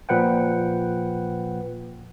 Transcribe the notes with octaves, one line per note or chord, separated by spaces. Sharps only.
A#2 F3 B4 F#5 G5